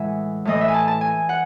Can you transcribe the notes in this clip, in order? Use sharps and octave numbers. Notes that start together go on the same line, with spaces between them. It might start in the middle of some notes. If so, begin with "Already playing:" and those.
Already playing: A2 E3 G#3 E5 F#5 G#5
A2 E3 A3 D#5
E5
G#5
A5
A5
G#5
F#5